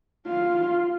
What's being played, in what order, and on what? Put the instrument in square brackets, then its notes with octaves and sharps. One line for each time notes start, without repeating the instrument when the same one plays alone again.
[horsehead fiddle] F4